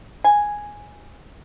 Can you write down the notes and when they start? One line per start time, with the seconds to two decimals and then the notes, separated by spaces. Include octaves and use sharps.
0.24 G#5